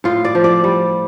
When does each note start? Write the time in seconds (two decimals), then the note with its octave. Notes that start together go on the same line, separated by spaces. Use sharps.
0.04 A2 F4
0.24 D5
0.35 F3
0.44 D5
0.64 G3